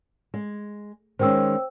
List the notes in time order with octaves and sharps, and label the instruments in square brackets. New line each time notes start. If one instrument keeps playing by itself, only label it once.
[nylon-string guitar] G#3
[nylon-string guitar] D#3 G#3 C#4 [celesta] C5 G5 E6